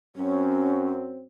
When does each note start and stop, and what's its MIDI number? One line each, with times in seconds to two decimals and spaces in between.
0.16 1.27 42
0.16 1.27 54
0.16 1.27 60
0.16 0.89 61